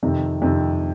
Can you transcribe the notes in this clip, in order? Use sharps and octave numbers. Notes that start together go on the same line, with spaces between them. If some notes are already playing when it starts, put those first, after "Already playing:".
F2 C3 D#3
F2 C3 D#3